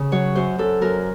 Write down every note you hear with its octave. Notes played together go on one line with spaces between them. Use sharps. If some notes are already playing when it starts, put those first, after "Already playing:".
Already playing: C#3
F#3 C#5
F#2 C5
F#2 A4
F#2 A#4